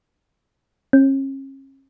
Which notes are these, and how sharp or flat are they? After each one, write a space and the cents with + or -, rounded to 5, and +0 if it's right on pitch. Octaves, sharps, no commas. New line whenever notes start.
C#4 -40